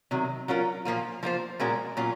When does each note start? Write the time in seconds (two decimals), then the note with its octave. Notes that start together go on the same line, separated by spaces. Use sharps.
0.11 C3 D#3 F#3
0.48 F#3 C#4 F4 A#4
0.85 A#2 F3 A#3 F4
1.23 F3 A#3 F4 C5
1.59 A#2 G#3 C#4 F#4 A#4
1.97 A#2 F#3 C#4 F4